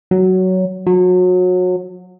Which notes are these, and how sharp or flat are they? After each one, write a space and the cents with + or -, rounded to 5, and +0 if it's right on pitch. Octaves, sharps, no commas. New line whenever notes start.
F#3 +10
F#3 -30